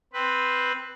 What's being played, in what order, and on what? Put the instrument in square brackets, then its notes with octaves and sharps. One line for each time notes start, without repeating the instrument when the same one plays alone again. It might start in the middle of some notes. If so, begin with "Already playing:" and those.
[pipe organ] C4 B4